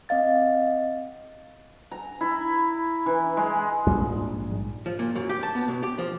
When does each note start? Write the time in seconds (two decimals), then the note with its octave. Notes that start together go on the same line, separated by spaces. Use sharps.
0.09 C4 D#5 F5 A6
1.91 A#5
2.21 E4
3.06 E3
3.37 G#3
3.86 A#1 G#2 G3
4.86 F3
4.99 A#2
5.15 F#2
5.29 G4
5.43 A5
5.55 B3
5.68 B2
5.83 G4
5.98 F3